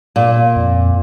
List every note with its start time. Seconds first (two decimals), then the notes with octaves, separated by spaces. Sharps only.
0.16 A#2
0.56 F2